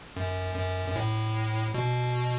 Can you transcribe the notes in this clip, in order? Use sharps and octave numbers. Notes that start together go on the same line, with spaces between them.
F#2
F#2
F#2
A2
B2